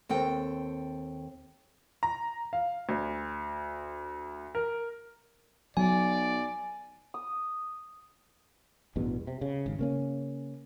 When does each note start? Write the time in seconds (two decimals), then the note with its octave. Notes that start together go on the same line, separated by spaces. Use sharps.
0.09 D#2 C4 A4 G5
2.03 A#5
2.53 F5
2.89 D2
4.55 A#4
5.77 B1 F#3 D5 G#5
7.14 D#6
8.96 A1 E2 G2 B2
9.27 C3
9.41 C#3
9.66 G#1
9.79 C#3 A#3 C#4